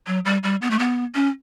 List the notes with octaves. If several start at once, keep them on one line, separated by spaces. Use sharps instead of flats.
F#3
G3
G3
B3
A3
B3
C#4